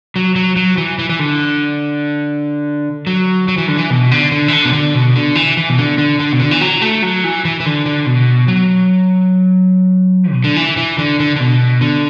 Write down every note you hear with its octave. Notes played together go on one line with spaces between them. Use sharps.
F#3
F#3
F#3
E3
E3
E3
D3
F#3
F#3
E3
D3
E3
B2
D3
D3
E3
D3
B2
D3
B2
D3
E3
E3
B2
D3
D3
D3
B2
D3
E3
F#3
A3
F#3
E3
E3
E3
D3
D3
B2
F#3
B2
D3
E3
E3
D3
D3
D3
B2
D3